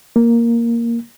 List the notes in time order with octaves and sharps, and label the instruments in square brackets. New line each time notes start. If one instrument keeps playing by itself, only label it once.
[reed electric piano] A#3